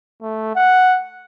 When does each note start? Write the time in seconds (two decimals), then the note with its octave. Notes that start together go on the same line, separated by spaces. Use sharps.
0.22 A3
0.56 F#5